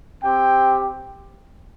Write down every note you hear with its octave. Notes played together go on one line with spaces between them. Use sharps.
C4 G4 G5